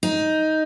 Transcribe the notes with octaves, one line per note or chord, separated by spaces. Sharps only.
D#4